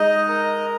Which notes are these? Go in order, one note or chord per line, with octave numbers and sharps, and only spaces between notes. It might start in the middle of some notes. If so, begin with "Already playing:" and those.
Already playing: G#3 D#4 D#5
A#4